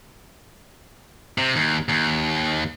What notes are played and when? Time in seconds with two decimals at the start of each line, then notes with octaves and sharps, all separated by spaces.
1.38 C3
1.56 D#2
1.89 D#2